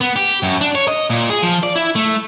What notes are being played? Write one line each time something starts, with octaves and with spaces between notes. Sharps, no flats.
B3
G4
F#2
D4
C#5
D#5
A#2
G#4
F3
D5
E4
A3